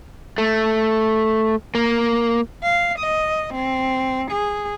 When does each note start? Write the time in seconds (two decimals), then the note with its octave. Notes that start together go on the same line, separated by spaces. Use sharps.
0.38 A3
1.75 A#3
2.63 F5
2.99 D#5
3.54 C4
4.32 G#4